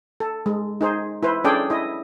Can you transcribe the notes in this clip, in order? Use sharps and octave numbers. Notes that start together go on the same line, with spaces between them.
A4
G#3
D#4 G#4 C5
E4 B4 C5
C#4 D4 G#4 A4 D5 G5
E4 D#5